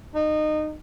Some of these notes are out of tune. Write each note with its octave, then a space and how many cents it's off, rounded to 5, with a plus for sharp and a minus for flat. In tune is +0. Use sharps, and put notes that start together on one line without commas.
D#4 -25